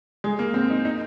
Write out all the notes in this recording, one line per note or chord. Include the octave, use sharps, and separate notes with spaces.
G#3
A#3
C4
D#4
D#4